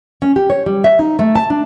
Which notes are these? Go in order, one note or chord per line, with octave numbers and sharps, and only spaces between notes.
C#4
G4
C#5
G3
E5
D#4
A3
A5
D4